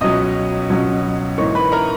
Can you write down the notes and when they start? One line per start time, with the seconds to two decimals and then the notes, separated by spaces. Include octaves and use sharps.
0.01 C#2 B2 F#3 C#4 D#5 D#6
0.69 C#2 B2 F#3 C#4
1.38 G#2 E3 A#3 D#4 C#5 C#6
1.55 B4 B5
1.72 A#4 A#5